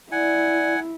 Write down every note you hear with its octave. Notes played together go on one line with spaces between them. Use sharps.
E4 D5 F#5 G#5